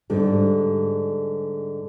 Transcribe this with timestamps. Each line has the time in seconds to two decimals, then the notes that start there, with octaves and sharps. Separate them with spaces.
0.10 G#2 D3 G3